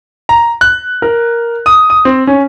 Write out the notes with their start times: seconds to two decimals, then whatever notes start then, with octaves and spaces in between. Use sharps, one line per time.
0.29 A#5
0.61 F#6
1.02 A#4
1.66 D#6
1.90 D#6
2.05 C4
2.27 C#4